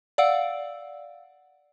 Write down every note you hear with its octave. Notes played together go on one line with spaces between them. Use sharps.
D5 F5 F#5 E6 D7